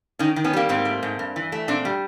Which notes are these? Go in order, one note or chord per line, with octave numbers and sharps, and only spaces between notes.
D#3 C#4 D#4
D#3
B3 C#4
G3 A#3 C4
G#2 A#3 C4
A3
G#2
G2
E3
A3
A#2 C4 D4
G3